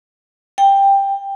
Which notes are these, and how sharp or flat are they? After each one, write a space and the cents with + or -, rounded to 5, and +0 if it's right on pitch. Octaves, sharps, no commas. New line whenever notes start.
G5 +10